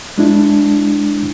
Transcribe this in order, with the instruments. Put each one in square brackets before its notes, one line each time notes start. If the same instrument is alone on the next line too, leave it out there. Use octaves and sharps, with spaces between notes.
[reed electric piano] G#3 D4 E4